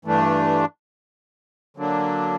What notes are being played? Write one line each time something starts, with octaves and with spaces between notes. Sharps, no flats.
G2 E3 A3 D4
D3 F#3 A#3 D4